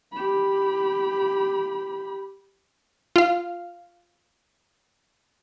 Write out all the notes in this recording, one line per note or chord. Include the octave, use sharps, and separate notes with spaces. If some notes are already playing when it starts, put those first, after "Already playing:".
G4 B5
F4 F5